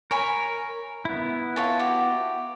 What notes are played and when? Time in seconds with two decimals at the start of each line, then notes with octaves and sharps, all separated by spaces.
0.11 A#4 C#5 G#5 B5
1.05 B3 E4
1.56 F4 C#5 A5
1.80 F#4 G4